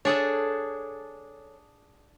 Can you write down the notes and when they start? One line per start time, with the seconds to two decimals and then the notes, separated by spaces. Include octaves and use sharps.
0.05 D4 G#4 A4 C#5 F#5